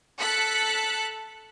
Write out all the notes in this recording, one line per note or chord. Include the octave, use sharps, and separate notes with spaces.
A4 F#6 B6 C#7